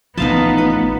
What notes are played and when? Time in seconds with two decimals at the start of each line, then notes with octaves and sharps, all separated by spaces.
0.18 A1 F3 B3 D#4 F5 A5
0.58 B4